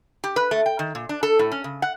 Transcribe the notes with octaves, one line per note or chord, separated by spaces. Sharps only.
G4
B4
A3
G5
D#3
A#2
D4
A4
A2
C#4
C#3
F#5